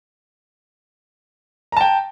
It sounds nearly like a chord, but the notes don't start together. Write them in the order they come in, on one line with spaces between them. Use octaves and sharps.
A#5 A5 G5